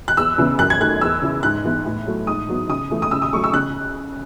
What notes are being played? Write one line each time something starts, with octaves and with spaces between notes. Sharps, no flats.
F#6
E2 E6
C#3 E3 B3
F#2 F#6
G#6
D#3 A3 F#6
E2 E6
C#3 E3
G#2 F#6
E3 B3
A2
F#3 A3
G#2 D#6
F#3 B3
C#3 D#6
E3 A3
D#6
C#3 E6
D#6
F#3 A3 C#6
E6
C#3 F#6